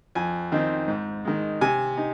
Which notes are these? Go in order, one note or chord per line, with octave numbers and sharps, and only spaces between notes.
F2 G#5
D#3 C4 D#4
G#2
D#3 G#3
C3 G#5
D#4